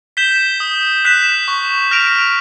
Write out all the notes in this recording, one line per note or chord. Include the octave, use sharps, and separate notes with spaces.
G6 B6 E7 G7
D#6
F#6 B6 E7
C#6
F6 A#6 D7 F7